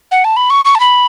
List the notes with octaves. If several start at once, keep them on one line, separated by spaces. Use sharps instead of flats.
F#5
A5
B5
C#6
C#6
A5
B5